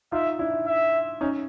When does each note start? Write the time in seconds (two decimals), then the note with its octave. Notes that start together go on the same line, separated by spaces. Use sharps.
0.12 D#4 F4 E5
0.39 D4 E4
0.67 E5
1.21 C#4 D#4